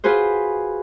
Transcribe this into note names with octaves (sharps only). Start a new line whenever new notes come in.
F4 F#4 G#4 B4 C5